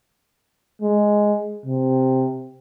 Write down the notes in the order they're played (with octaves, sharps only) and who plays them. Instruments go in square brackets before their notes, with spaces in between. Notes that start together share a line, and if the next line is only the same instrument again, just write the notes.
[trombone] G#3
C3